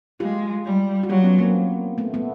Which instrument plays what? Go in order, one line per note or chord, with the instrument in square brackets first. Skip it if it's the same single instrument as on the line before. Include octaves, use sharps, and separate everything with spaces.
[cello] G#3 [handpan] F4 G4
[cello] G3
[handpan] F#4
[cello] F#3 [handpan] F4 G4
[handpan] B3 C#4
A#3 C4
A3 B3
A3 B3